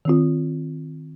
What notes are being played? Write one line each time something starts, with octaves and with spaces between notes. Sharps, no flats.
D#3 C4 F4